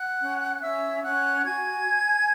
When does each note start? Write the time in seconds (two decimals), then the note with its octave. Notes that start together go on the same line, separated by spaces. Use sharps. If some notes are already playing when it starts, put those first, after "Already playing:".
Already playing: F#5 F#6
0.21 C#4
0.62 C#4 E5 E6
1.03 C#4 F#5 F#6
1.45 F#4 G#5 G#6